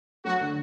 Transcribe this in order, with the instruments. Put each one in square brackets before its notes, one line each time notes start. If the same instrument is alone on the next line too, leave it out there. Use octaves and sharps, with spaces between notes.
[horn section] F#3 F#4 [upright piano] A3
[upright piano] D3